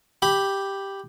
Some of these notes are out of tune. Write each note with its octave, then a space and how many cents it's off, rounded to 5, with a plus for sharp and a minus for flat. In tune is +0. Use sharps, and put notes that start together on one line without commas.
G4 +0 B5 +0